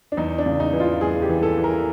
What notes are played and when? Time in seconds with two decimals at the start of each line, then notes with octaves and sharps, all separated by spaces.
0.12 D4
0.17 E2 D#4
0.38 D4
0.46 C#3
0.60 D#4
0.73 E3
0.80 F4
1.01 E2 G#4
1.22 G4
1.29 E3
1.43 A4
1.58 E3
1.64 A#4